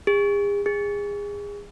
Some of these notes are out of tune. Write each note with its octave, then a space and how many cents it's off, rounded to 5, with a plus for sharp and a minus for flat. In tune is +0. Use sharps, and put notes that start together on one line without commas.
G#4 -40
G#4 -25